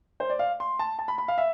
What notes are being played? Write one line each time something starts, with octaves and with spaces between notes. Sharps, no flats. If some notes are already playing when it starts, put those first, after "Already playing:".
C5
D5
F5
C6
A5
A5
B5
B5
F5
E5